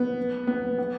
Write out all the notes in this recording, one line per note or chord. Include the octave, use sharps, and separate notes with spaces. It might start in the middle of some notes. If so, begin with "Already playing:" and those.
Already playing: B3
B3
B3